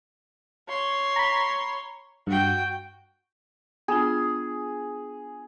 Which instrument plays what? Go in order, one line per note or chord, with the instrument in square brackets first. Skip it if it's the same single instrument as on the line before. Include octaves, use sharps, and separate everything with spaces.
[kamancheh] C#5 C6
[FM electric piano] A#5 B5
[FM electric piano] G2 [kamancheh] F#4 G5
[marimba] B3 D4 F4 [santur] G#4